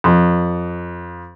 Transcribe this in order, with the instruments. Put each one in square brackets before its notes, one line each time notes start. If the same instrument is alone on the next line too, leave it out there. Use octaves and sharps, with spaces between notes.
[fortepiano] F2